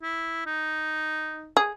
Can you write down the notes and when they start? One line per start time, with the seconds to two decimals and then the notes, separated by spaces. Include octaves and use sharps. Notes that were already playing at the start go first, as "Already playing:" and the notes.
0.03 E4
0.46 D#4
1.57 G#4